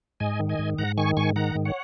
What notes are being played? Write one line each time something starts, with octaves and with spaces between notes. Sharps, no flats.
G#2 D#5 G#5
D#3
D#5 G#5
G#2
G#2 F#5 A#5
D#3 G#5 C#6
G#2 G#5 C#6
D#3 F#5 A#5
G#2
C#5 F#5